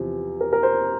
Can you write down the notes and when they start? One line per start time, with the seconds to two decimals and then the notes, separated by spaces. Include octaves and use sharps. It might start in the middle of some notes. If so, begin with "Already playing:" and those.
Already playing: E2 C3 F3
0.41 A#4
0.53 A#4
0.63 C5